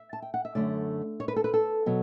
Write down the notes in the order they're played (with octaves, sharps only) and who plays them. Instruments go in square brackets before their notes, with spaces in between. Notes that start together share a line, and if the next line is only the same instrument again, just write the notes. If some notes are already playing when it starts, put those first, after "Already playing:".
Already playing: [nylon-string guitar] E5
A5
G5
F#5
E5
F#2 D3 A3 C#4 D5
C#5
B4
A4
B4
A4
B2 F#3